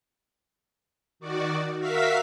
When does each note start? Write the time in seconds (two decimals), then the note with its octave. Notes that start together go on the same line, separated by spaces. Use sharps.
1.19 D#3 F#4 D5
1.78 F#4 A#4 E5 F5 B6